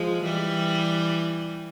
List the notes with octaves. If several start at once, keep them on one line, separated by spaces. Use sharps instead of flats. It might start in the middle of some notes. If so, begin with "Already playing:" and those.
Already playing: F3 G#3
E3 G3